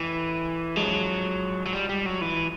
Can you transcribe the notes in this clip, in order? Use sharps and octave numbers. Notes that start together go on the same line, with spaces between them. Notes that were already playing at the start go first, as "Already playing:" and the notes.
Already playing: A1 A2 E3
A1 G#2 F3 F#3 G#3
F#3
G3
G3
F#3
E3